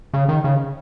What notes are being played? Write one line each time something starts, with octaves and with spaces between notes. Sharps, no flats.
C#3
D#3
C#3